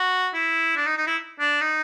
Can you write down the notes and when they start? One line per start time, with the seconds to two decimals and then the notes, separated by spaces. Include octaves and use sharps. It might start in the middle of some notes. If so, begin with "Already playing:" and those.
Already playing: F#4
0.34 E4
0.76 D4
0.86 D#4
0.97 D#4
1.07 E4
1.40 D4
1.61 D#4